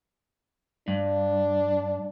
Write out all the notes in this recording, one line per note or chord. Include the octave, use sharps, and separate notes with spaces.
G2 D4